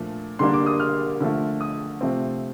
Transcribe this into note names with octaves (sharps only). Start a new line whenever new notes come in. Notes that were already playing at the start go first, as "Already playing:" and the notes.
Already playing: A#2 F3 A3 D4
D3 G3 A#3 D4 C6
D6
D#6
F6
D3 F3 A3
D#6
C3 F3 A3 C4